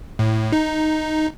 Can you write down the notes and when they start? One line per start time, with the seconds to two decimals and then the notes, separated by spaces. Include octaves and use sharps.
0.19 A2
0.52 D#4